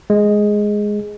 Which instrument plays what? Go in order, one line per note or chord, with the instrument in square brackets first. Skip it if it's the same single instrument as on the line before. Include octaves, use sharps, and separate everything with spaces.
[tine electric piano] G#3